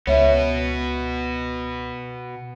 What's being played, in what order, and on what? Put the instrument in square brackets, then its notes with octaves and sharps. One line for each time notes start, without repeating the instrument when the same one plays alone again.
[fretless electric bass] C#2 [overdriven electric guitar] B2 B3 [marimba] C#5 E5